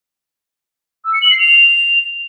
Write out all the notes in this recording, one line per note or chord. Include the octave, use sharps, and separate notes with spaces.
E6
C#7
F#7
C7
F7